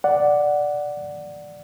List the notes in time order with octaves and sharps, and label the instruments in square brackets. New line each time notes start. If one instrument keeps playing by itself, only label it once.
[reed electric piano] D5 F#5